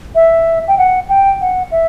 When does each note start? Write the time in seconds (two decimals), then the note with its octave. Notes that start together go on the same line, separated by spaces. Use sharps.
0.15 E5
0.68 G5
0.78 F#5
1.09 G5
1.41 F#5
1.71 E5